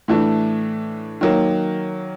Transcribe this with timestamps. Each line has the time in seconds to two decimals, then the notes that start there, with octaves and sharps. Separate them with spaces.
0.08 A2 E3 A3 D4
1.21 D#3 F#3 A#3